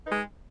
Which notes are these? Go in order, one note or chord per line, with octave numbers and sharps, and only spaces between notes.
G#3 D#4 B4